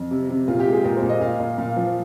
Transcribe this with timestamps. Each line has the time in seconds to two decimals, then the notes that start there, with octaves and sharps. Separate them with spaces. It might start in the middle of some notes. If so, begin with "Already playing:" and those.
Already playing: F2
0.11 C3
0.29 C3
0.48 A#2 F4
0.60 G4
0.66 G#3
0.73 G#4
0.84 A#2 A#4
0.97 C5
1.02 A#2
1.09 D#5
1.21 A#2 F5
1.40 A#2
1.58 A#2 F5
1.76 F3